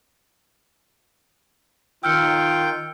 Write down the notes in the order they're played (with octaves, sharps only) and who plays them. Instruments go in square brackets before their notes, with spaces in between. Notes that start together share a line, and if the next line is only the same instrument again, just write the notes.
[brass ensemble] D#3 F4 [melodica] G5 [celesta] E6 F6 C#7